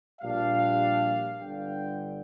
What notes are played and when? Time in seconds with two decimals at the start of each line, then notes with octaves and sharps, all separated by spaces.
0.22 A#1 A#2 G3 D4 F5
1.39 G1 G2 D3 G5